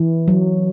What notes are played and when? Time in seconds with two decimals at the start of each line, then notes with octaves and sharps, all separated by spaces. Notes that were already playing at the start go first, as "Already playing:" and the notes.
Already playing: E3
0.28 F#3